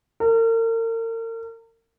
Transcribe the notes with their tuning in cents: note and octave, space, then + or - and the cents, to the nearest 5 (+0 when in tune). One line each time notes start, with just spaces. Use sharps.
A#4 -40